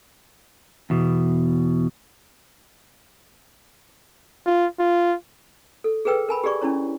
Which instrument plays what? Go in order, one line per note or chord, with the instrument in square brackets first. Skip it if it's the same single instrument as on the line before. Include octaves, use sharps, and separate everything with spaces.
[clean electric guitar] E2 B2
[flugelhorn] F4
F4
[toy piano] A4
G#4 A4 B4 G5 E6
A#4 G#5 B5
G4 G#4 D5 C#6
C#4 D4 E4 C#5